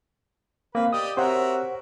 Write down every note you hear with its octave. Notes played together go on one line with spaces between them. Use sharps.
A#3 C4 B4 F5
G4 D5 D#5 D#6
C4 F#4 G4 A#4 C5 C#5 E5 F#5